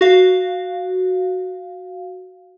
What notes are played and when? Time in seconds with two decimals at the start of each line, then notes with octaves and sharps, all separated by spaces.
0.01 F#4 F5